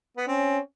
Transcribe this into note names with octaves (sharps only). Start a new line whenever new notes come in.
B3
C4 C#4